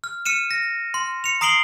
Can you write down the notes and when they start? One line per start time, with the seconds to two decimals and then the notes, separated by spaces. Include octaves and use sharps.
0.04 F6
0.25 F6 C#7 D#7 E7
0.51 A#6
0.94 C6
1.24 C#7 F7
1.41 A#5 D#6 C7 D7 F#7 G7